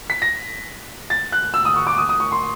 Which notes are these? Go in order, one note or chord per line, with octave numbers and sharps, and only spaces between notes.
B6
A#6
A6
F#6
E6
D#6
C#6
D6
D#6
D#6
C#6
C6